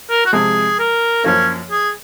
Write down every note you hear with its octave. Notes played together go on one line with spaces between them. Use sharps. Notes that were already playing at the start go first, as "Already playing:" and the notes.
A#4
F#4
C3 F3 G#3 G#4
A#4
F#2 F3 A#3 C#4
G#4